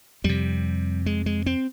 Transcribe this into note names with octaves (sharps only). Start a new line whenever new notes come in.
F2 C3 G3
G#3
G#3
C4